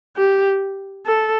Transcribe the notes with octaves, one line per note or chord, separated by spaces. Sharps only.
G4
A4